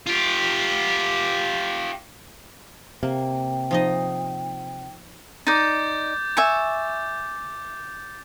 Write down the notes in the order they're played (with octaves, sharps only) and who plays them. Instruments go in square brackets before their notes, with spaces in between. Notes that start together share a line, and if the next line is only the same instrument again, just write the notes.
[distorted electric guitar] F4 G4
[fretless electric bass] C3 [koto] A#3 [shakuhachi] G5
[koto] F3 D#4 D#5
[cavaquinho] D#4 D5 [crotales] D6 G6 A6
[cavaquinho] E5 G#5 C#6